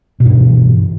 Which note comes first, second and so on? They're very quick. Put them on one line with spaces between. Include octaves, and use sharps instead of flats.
B2 G2 E3